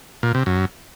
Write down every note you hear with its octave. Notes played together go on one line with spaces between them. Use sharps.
A#2
C3
F#2